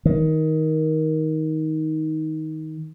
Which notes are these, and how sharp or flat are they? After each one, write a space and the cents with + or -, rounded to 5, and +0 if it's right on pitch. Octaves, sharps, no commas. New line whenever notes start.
D#3 +15